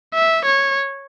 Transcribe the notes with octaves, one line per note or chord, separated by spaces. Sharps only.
E5
C#5